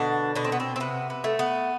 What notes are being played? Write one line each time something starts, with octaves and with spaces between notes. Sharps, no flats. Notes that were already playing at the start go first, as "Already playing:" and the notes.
Already playing: B2 D3 D4
B2 D4
C4
B3
C4
C4
C3 B3
B3
A3
B3